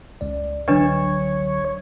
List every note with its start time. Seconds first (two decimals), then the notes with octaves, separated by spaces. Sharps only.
0.21 C#2 D5
0.68 C#2 D3 F#3 D4 B4 C#5 D#5